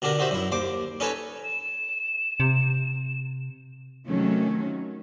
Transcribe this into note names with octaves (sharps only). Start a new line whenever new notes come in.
B2 D3 D4 G4 A#4
D#4 F#4 G4 C5 E5
F#2 E4
D#2 C5 D6
C#4 D#4 A4 B4 G#5 A5
E7
C3
C3 D#3 F#3 A3 C#4